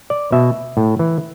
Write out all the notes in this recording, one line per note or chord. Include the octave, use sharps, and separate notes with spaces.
D5
B2 E5
A2
E3